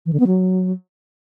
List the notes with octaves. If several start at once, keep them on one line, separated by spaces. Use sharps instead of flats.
E3
D3
B3
F#3